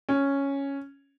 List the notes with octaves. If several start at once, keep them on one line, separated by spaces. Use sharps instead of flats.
C#4